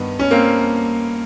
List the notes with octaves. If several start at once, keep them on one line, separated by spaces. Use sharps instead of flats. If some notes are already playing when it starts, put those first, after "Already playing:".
Already playing: G2 D#3 B3
C#4
A#3 C4